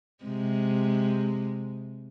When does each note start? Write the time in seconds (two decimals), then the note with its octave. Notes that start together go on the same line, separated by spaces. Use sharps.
0.24 C3 G#3